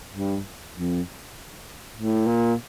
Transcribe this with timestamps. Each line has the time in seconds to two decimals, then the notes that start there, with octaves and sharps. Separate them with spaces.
0.12 G2
0.74 F2
1.96 A2
2.27 A#2